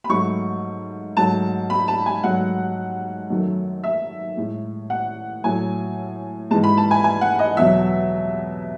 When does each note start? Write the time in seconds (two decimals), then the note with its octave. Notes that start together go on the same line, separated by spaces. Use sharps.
0.04 B5
0.10 G#2 F#3 A3 C#6
1.17 G#2 F#3 A3 A5
1.70 B5
1.88 A5
2.06 G#5
2.23 G#2 F#3 A3 F#5
3.30 F#2 D#3 F#3 A3
3.84 E5
4.37 A2 G#3
4.90 F#5
5.44 A2 F#3 A3 G#5
6.51 G#2 E3 G#3 A5
6.64 B5
6.77 A5
6.91 G#5
7.04 G#5
7.21 F#5
7.39 D#5
7.57 E2 B2 F#3 E5